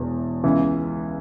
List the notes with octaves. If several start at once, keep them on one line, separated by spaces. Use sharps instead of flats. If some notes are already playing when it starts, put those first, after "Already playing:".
Already playing: E1 E2 B2
C#2 C#3 E3 B3